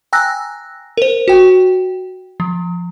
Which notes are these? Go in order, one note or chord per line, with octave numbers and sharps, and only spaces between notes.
G5 G#5 A#5 E6 F#6 A#6
A#4 C5
F#4 G5
F3